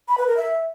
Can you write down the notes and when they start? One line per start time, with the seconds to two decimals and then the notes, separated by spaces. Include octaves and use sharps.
0.08 B5
0.18 B4
0.27 A#4
0.37 E5